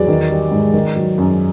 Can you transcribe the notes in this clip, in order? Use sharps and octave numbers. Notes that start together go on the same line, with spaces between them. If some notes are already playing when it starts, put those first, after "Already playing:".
Already playing: E2 F#3 D5
D#3
G3
G#2
D#3
F#3
F#2